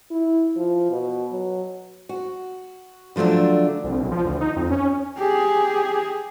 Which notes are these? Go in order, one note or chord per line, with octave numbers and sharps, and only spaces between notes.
E4
F3
B2
F#3
F#4
D3 F3 F#3 A3 D4
C2
B1
F3
D2
D#4
F2
C#4
G4 G#4